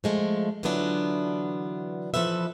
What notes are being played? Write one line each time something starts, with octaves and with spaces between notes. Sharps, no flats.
F3 G#3 A3
D3 E3 F#3 B3 D4 F4
E3 F3 A4 B4 E5